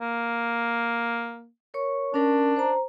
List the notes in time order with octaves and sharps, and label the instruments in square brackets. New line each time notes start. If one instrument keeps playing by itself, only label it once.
[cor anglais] A#3
[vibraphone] A#4 C#5 C#6
[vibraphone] C#4 A#4 [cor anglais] D4
[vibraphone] C5 A#5